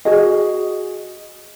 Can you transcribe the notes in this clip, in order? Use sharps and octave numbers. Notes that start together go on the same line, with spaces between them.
F#4 G#4 D#5